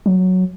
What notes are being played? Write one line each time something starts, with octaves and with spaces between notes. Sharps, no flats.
F#3